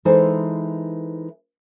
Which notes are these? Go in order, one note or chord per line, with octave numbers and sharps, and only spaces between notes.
E3 G#3 D#4 A4 C5 G#5